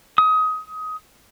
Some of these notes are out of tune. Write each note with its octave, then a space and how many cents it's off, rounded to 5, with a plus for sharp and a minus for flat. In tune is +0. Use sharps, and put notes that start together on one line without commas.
D#6 +20